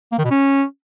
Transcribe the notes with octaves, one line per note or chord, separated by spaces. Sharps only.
A#3
D#3
B2
C#4